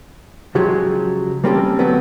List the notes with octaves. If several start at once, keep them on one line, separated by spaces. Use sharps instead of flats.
C#3 F3 F#3 G#3 G4 G#4
G3 A#3 C4 C#4 G4 A4
D3 F#3 A3 B3 C4